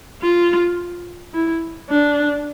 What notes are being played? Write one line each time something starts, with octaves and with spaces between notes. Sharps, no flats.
F4
E4
D4